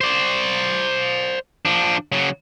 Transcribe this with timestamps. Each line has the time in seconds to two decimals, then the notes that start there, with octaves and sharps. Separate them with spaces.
0.01 C5 D5
1.65 F3 D4
2.12 C#3 F#3